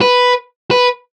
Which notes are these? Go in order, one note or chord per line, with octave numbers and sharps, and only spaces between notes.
B4
B4